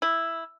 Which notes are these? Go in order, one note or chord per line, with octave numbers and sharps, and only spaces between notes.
E4